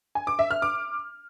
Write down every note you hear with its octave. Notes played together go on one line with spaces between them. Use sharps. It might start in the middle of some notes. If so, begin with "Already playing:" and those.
G#5
D6
E5
F6
D6